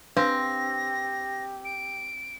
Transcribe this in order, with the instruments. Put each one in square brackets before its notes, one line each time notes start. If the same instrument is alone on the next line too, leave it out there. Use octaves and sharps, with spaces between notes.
[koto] C4 [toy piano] D4 B4 F5 [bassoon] G4 [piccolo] A#6
[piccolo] D7